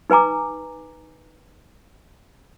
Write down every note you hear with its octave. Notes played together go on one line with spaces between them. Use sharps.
D#4 B4 G#5 A#5 D6